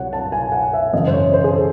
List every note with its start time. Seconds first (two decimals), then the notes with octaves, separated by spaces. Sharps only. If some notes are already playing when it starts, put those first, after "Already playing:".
Already playing: C2 C3 F#3 C#5 F#5
0.13 A5
0.32 G#5
0.52 F#5
0.73 E5
0.93 G#1 F#2 C#3 E3 D#5
1.07 C5
1.13 C#5
1.34 C5
1.44 G#4
1.53 A4